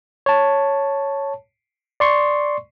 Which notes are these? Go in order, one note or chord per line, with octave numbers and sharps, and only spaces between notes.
C#5 A5
D5 C6 C#6